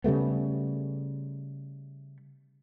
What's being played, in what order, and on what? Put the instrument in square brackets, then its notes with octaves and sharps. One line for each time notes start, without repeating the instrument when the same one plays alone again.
[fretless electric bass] C#3 G3 A3 B3